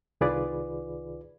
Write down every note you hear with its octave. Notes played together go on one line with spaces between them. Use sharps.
C2 D#3 F4 G#4 B4 D5